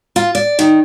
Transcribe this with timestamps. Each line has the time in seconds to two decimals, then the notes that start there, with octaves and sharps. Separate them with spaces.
0.16 F4
0.35 D5
0.59 D#3